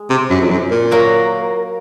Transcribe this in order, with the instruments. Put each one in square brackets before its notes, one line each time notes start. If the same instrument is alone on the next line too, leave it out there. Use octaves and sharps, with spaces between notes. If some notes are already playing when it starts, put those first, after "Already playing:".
Already playing: [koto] G#3
[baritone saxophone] C3
F#2
F2
F#2
A#2
[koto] F#3 A#3